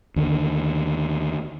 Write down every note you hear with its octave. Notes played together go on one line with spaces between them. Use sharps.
D#2 D3